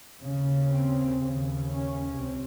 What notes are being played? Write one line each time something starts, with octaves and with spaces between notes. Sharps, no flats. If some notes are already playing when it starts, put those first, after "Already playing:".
D#2 C#3
C4
D#2 C#3
C#4
C#2 C3 C4